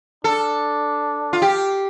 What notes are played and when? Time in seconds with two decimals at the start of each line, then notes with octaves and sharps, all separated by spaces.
0.24 D4 A4
1.33 F4
1.42 G4